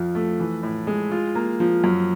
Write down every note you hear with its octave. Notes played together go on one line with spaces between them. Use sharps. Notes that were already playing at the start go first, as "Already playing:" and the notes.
Already playing: F2 F3
A3
E3
A2
G#3
F4
A#3
F3
F#2